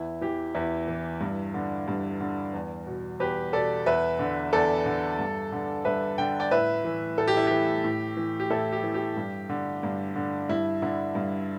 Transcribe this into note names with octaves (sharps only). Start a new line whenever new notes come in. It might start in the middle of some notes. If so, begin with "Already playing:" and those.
Already playing: E2 E4
E3 G4
E2 E4
E3
G2
D3
G2
D3
E2
B2
E2 G4 B4
B2 A4 D5
E2 B4 E5
D3
E2 A4 D5
D3
G2
D3
G2 B4 E5
D3 G5
D5 G5
A2 B4 E5
E3
A2 A4
G4
E4
E3 G4
A2
E3
G4
A2 E4 A4
G4
E3
G4
G2
D3
G2
D3
G2 E4
D3 E4
G2